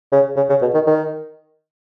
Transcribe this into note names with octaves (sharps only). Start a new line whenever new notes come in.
C#3
C#3
C#3
B2
D#3
D#3